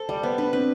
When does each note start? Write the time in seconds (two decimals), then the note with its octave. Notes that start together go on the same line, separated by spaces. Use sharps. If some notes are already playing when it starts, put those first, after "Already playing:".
Already playing: A4 C5
0.09 G3 D5
0.23 B3 C5
0.38 D4 B4
0.53 C4 B4